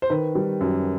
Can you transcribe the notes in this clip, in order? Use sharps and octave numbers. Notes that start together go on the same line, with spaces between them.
C5
D#3 B4
G3
F#2